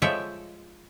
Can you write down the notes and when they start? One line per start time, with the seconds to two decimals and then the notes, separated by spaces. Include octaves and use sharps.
0.02 F3 G#3 A4 C#5 E5 G5